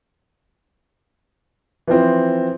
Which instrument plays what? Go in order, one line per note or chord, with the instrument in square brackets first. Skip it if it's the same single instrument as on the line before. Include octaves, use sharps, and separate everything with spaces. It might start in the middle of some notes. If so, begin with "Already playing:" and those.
[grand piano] E3 F3 C4